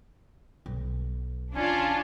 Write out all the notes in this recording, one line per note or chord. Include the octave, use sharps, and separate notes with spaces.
B1
D3 C#4 D4 F4